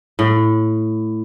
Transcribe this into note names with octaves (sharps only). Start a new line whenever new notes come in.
A2